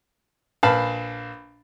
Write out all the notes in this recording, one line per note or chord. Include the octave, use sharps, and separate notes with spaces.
A#1 B4 F5 A5 B5